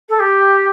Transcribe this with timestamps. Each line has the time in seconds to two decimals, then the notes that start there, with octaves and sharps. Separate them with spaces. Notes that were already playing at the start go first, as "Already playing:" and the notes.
0.09 A4
0.19 G4